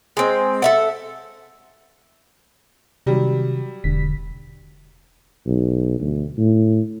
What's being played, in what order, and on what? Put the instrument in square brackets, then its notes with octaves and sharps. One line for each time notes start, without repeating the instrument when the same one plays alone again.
[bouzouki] G#3 C4
A4 E5 F#5
[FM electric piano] C3 D#3 [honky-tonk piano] F#3 G3
[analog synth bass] E1 [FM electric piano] E2 D3 B6
[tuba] B1
D2
A2